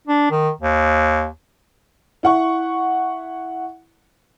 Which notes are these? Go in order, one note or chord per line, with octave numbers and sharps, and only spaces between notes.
D4
D#3
D#2
E4 F#5 C#6